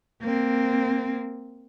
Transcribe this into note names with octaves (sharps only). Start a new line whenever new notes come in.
A#3 C4